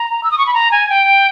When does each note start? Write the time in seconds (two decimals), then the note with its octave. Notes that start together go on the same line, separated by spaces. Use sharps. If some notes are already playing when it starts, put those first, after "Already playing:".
Already playing: A#5
0.23 E6
0.31 D#6
0.38 C#6
0.47 B5
0.54 A#5
0.72 G#5
0.89 G5